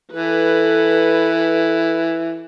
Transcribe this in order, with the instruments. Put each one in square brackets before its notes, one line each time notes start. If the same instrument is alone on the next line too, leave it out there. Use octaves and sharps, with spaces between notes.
[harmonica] E3 [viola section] A4 B4